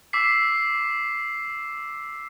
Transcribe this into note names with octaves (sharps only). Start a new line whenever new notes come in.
D6 E6 B6 C7